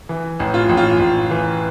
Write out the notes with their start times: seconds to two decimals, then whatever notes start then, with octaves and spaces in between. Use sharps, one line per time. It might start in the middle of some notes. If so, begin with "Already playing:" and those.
0.09 E3
0.39 A1
0.54 F4
0.69 A1
0.77 F4
0.99 A1
1.31 E3